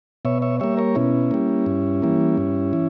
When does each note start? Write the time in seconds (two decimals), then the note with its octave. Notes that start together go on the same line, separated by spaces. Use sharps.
0.25 B2 C#5 E5
0.42 C#5 E5
0.60 G3 A#3 C#5 E5
0.77 A#4 C#5
0.95 B2 C#4 E4
1.31 G3 A#3
1.66 G2
2.02 E3 G3 A#3
2.37 G2
2.73 E3